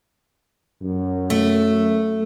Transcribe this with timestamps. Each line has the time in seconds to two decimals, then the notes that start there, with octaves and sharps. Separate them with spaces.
0.82 F#2
1.30 A3